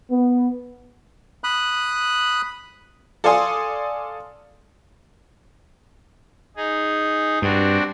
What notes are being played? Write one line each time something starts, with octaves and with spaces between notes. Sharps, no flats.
B3
B5 D#6 F#6
A4 D5 F5 G#5 C6 D#6
D#4 G#4
G2 C4 D4 F#4